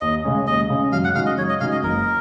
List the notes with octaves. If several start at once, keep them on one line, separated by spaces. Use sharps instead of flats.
D#2 D#5
C#3 G#3 C#4
D#2 D#5
C#3 G#3 C#4
F#2 F5
F#5
C#3 G#3 D#4 F#4 F5
D#5
F#2 C#5
D#5
C#3 G#3 D#4 F#4 F5
D#5
F#1 A#4